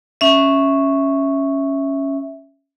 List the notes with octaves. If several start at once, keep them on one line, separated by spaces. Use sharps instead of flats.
C#4 E5